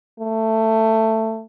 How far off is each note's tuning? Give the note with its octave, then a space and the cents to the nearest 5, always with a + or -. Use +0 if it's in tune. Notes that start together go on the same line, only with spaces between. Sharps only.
A3 +15